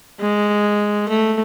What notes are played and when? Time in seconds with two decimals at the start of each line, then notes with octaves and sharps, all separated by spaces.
0.20 G#3
1.08 A3